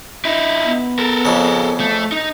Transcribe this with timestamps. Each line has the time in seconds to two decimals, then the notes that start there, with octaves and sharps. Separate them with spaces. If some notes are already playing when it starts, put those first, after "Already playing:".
0.25 D#4 E4
0.65 B3
0.99 A4 A#4
1.25 F2 C#3
1.80 A3
2.12 D#4